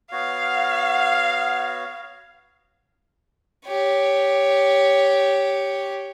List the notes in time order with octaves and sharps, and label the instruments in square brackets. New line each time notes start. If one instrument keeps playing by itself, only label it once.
[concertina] B3 F#4 C#5 [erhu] F5
[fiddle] G4 C#5